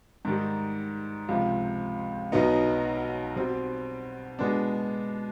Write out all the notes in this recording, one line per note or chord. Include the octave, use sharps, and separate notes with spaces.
G#2 D#3 G3
C#2 C3 F3
B1 B2 F#3 B3 D#4
B2 G3 C4
B2 G#3 B3 D4